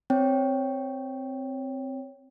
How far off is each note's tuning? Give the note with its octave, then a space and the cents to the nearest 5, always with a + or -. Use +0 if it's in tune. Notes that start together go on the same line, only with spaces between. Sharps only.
C4 +0 C#5 +0 G5 +0